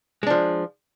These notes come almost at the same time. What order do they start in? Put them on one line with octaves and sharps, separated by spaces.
G#3 D4 F3